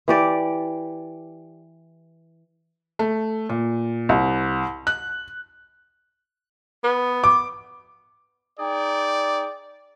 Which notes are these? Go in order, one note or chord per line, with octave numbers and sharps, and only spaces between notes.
E3 G4 D5
A3
A#2
C2
F#6
B3
D6
D#4 G#4 D5 G5